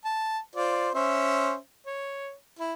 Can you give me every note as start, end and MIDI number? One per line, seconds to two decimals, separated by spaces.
0.05 0.38 81
0.55 0.90 65
0.55 0.90 72
0.55 0.90 74
0.95 1.56 61
0.95 1.56 72
0.95 1.56 76
1.86 2.33 73
2.59 2.74 64